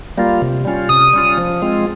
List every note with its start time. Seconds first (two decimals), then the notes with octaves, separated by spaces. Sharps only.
0.18 G3 A#3 F4
0.42 C3
0.65 G3 C#4 F4
0.89 C3 D#6
1.13 G3 C#4 F4
1.38 F3
1.62 G#3 C4 F4